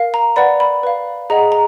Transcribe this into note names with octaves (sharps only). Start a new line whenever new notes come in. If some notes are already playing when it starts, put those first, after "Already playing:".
Already playing: A#4 F5
A#5
B4 D5 F#5 B5
B5
B4 F5
G#4 D#5 F#5 A#5
A#5